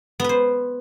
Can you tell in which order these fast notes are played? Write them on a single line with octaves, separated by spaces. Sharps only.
B3 B4 C5